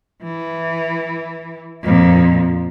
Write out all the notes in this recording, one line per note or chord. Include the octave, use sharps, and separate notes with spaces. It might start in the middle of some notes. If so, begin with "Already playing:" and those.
E3
F2 A#2